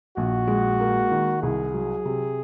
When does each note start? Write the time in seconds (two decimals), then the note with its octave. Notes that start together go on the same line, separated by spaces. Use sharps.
0.17 A#1 F#4
0.47 G#3
0.80 A#3
1.11 D#3
1.42 C2 G#4
1.74 F#3
2.05 C3